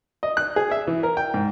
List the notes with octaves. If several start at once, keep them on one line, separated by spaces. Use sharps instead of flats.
D#5
F#6
G#4
E5
E3
A#4
G5
G#2